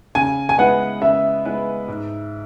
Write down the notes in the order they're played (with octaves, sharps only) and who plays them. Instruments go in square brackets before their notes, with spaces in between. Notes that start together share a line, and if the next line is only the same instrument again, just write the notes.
[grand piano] C#3 [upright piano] G#5
[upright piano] G#5
[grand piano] G#3 B3 E4 B4 [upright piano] F#5
[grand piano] C#3 [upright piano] E5
[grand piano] G#3 B3 E4 B4
G#2